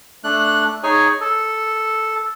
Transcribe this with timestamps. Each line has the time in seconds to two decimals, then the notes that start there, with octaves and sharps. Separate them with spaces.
0.24 A3 D4 F#6
0.83 D#4 G#4 C#5 G#5
1.21 A4